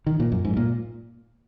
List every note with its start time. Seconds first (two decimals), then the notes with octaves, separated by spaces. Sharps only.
0.06 D#3
0.20 A#2
0.32 F#2
0.45 G#2
0.57 A#2